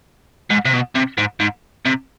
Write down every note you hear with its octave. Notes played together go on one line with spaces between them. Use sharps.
G#2
C3
B2
C3
G#2
G#2
C3